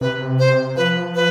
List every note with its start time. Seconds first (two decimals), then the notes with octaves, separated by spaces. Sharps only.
0.01 C3 B4
0.39 C5
0.76 F3 B4
1.15 B4